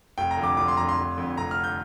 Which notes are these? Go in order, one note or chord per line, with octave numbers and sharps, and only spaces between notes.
F1 G5
A#5
F2 D3
D6
F1 D6
C6
F2 D3 A#5
C6
F1
F2 D3
F1 A#5
F6
D3
G6